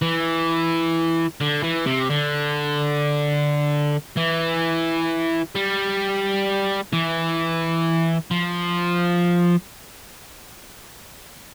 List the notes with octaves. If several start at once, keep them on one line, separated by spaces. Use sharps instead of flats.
E3
D3
E3
C3
D3
E3
G3
E3
F3